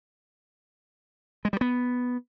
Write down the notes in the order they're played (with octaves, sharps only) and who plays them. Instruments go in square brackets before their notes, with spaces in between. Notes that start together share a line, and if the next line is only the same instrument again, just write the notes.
[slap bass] G#3
G3
B3